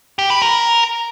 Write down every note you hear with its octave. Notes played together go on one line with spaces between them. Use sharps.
G4
B4
A#4